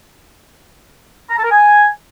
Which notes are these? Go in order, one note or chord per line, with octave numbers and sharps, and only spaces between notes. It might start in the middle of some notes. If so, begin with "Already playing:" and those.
A#5
A5
A#4
G#5